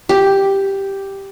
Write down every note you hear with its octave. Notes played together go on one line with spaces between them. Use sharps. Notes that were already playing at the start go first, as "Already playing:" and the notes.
G4